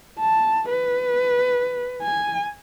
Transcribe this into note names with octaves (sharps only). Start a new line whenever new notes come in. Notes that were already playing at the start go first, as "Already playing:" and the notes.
A5
B4
G#5